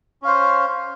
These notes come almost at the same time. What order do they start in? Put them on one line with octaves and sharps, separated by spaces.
C#4 F5 C5